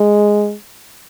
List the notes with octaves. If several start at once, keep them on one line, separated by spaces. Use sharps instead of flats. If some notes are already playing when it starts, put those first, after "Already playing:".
Already playing: G#3